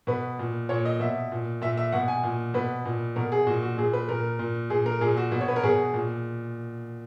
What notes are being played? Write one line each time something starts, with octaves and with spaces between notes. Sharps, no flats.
B2 B4
A#2
A#2 C#5
D#5
B2 E5
A#2
A#2 E5
E5
B2 F#5
G#5
A#2
B2 B4
A#2
B2 A#4
G#4
A#2 F#4
F#4
A#2 G#4
B4
A#2 A#4
A#2
A#2 G#4
A#4
A#2 G#4
F#4
B2 F#4
C#5
B4
A#4
B2 G#4
A#2